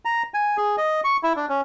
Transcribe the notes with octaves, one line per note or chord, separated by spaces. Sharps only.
A#5
G#5
G#4
D#5
C#6
E4
D4
C#4